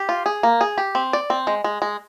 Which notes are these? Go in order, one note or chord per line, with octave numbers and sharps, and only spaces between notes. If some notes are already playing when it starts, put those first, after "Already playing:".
Already playing: G4
F4
G#4
A#3
G#4
G4
C4
D5
C4
G#3
G#3
G#3